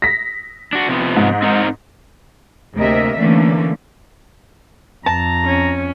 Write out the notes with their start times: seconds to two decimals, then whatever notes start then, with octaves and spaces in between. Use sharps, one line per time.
0.02 A#6 B6
0.73 D4 F#4
0.89 C3 F3 B3
1.16 G#2
1.42 C4 D#4 A#4
2.76 D2 C3 A#3 A#4 D#5 E5
3.18 D3 E3 A3 A#3 C#4
5.06 F2 A5 A#5
5.45 C#4